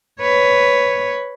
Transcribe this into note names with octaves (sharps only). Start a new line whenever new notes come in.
B4 C#5